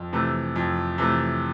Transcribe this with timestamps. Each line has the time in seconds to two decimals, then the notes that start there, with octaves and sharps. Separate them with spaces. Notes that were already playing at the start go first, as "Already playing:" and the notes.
Already playing: F2
0.13 C3 E3 A3
0.56 F2
0.98 C3 E3 A3